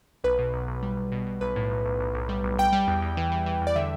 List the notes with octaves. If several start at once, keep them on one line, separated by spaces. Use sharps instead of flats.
B1 B4
B2
B1
B1
G3
B1
B2
B2
B1 B4
A2
B1
B1
B1
B1
G3
B1
G3 G5
G3
E2
E2
E3
E3
E3
E2
D5
D3 E5